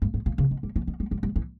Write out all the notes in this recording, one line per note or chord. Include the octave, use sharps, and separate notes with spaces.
G2
G#2
A#2
C#3
D#3
G3
E3
D#3
G3
G3
G3
E3